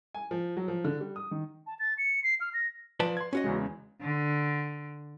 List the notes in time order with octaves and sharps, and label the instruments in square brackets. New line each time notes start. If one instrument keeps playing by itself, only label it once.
[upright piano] G#5
F3
F#3
F3
D3
G3
D#6
D#3
[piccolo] A5
A6
C#7
C7
F6
A#6
[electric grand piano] F3 [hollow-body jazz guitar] B4 D5 A5
[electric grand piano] C6 G#6
[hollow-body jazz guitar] C#4 F#4 D#5
[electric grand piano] E2 C#3 G#3
[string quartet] D3